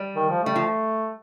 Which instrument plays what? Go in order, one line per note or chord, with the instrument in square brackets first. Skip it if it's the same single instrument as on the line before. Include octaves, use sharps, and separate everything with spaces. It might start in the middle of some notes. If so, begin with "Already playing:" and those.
Already playing: [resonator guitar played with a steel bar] G3
[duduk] D#3
F3
[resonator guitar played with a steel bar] G3 [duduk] A3
[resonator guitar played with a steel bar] F3